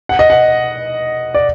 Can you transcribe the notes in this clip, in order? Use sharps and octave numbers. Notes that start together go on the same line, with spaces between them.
F#5
D#5
F#5
D5